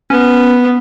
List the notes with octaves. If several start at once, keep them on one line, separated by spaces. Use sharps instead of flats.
B3 C#4